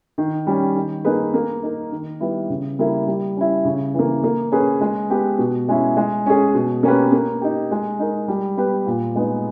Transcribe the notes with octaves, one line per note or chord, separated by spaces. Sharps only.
D#3
G3 C#4
D#3
A#3 D#4 G#4 B4
A#3
D#4 A#4
D#3
G3 B3 E4
C#3
G3 A#3 E4 A#4
G3
C#4 E4
C#3
E3 A#3
A#3
C#4 G#4 B4
G#3
B3 G4 B4
B2
G#3 C#4 E4
G#3
C#4 G#4
B2
A#3 C#4 G4 B4
A#3
D#4 G4
G#3
D#4 A#4
G3
B3 G4 B4
A#2
G#3 B3 D#4